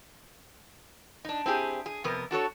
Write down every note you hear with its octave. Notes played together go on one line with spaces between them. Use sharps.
D4 D#4
C4 E4 G4 G#4
G#4
F2 C3 B3 A#4
D4 F#4 A4 C#5